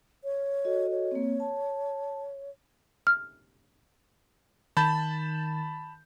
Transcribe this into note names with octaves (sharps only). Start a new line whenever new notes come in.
C#5
F#4 A4 D#5
C#5
A#3 C4
A5
F6
D#3 A5 B5 G6 A6 E7